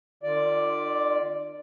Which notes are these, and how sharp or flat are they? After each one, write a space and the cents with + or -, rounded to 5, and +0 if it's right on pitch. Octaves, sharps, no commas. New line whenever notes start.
D#3 -45 F4 +0 D5 +0